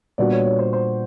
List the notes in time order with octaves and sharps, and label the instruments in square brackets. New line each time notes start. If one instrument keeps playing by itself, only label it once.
[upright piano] A#2 G3 B3 D4 F#4 [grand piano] D5
[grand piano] C#5
C#5
C5
C5